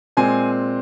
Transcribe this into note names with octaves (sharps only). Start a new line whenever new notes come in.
A#2 G#3 C4 G#5